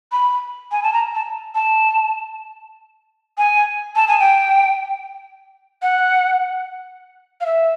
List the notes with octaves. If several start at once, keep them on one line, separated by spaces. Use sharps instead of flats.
B5
G#5
A5
A#5
A5
A5
G#5
A5
G#5
G5
F#5
F5
E5